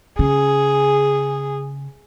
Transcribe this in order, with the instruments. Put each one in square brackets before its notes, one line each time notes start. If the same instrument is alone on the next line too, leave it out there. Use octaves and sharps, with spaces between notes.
[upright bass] C#3 [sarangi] G#4